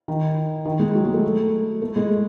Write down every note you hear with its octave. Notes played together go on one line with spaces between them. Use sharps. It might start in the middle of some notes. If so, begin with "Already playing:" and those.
D#3
D#3
G#3
F#3
G#3
A3
A3
G#3